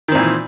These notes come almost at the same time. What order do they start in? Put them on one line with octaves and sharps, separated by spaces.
D#3 C4 A#2 E3